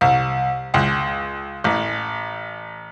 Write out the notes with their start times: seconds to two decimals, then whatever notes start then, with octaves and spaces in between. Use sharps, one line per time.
0.01 C2
0.74 C#2
1.64 A1